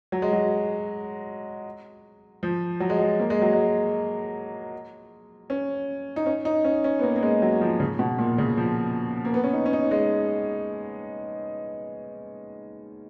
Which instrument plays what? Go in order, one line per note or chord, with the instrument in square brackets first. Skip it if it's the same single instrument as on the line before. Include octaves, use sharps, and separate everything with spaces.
[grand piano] F#3
G#3
F#3
F3
F#3
G#3
F#3
A#3
G#3
F#3
G#3
C#4
D#4
C#4
D#4
C#4
C#4
B3
A#3
A#3
G#3
F#3
F3
C#3
B2
A#2
C#3
F3
A#3
B3
C#4
D#4
C#4
D#4
G#3